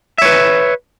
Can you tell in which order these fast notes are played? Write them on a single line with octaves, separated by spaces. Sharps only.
E5 C#5 B4